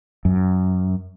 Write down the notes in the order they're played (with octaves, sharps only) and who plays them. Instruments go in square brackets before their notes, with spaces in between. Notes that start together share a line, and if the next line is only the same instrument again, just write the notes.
[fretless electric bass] F#2